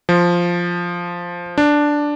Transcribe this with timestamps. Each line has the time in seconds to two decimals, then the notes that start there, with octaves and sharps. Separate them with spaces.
0.09 F3
1.58 D4